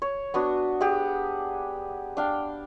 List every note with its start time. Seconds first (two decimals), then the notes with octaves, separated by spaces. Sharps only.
0.02 C#5
0.34 B3 D4 F#4
0.81 G4 G#4 F#5
2.17 D4 F5 G5